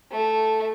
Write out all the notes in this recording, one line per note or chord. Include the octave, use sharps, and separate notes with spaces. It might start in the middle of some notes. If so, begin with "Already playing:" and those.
A3